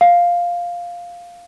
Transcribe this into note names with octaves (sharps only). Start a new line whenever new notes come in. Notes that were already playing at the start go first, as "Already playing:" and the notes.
F5